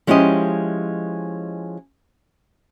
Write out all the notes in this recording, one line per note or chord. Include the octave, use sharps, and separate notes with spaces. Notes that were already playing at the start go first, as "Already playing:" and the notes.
F3 G#3 C#4 E4 G4 D#5